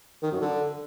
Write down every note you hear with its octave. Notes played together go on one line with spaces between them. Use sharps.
D#3
F#2
D3